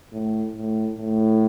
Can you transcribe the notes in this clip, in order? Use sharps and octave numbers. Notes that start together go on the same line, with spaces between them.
A2
A2
A2